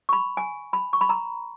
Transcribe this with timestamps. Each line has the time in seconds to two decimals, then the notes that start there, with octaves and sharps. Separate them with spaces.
0.09 C#6
0.13 B5
0.37 G#5
0.73 B5
0.93 C#6
1.01 B5
1.09 A#5